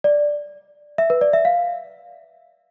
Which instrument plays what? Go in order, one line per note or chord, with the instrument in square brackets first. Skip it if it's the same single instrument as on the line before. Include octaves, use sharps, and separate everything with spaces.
[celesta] D5
E5
B4
D5
E5
F5